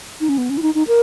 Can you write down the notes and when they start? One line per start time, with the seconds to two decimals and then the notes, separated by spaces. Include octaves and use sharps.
0.20 D#4
0.29 C#4
0.38 B3
0.50 C#4
0.57 E4
0.62 D#4
0.75 D#4
0.88 A#4